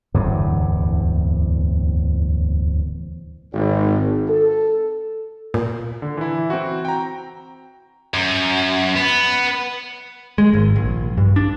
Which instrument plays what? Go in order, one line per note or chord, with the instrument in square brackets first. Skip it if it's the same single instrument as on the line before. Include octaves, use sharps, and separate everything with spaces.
[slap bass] D1 E2 G2 C3
[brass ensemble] G#1
A4
[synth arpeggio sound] A#2
[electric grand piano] D3
E3 E4
C4 F#4
G5 A#5
[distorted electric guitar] F#2
B3
[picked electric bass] G#3
G#1
A#1
G2
D4